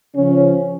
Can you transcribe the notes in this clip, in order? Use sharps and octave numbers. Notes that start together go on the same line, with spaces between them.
C#3 F3 C#4